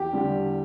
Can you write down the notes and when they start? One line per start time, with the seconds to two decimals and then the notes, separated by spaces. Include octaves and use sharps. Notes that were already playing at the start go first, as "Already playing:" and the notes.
Already playing: E2 G4
0.13 D3 G3